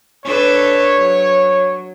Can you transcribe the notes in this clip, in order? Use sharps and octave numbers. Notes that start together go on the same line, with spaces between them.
D4 A4 B4 C#5
F#3